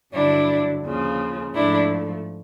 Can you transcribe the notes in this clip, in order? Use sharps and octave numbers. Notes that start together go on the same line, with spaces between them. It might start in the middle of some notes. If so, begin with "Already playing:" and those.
G2 D3 F#3 D4 E4
D#2 C#3 F3
G#2 F3 A3 D4 E4